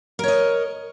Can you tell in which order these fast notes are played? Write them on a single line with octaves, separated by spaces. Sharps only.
A#4 C#5 D#5